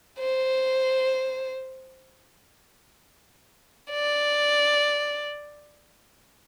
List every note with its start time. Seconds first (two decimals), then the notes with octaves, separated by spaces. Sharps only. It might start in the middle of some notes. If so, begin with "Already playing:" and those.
0.19 C5
3.91 D5